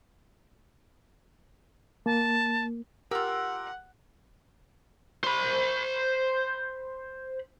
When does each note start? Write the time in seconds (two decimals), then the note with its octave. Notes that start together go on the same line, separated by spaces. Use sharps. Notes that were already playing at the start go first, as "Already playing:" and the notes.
2.06 A#3 A5
3.11 F4 G4 A#4 F#5 E6
5.24 C5 B5